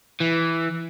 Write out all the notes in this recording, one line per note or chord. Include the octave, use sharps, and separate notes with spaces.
E3